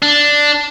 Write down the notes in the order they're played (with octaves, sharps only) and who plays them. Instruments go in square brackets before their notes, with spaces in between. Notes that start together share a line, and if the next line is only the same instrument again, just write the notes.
[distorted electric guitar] D4